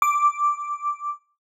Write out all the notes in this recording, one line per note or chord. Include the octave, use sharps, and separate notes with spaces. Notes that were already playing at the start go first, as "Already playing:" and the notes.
D6